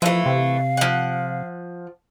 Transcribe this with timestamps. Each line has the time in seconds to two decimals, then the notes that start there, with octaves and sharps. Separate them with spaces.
0.02 E3 F3 A3 F5
0.26 C3
0.77 F3 F#5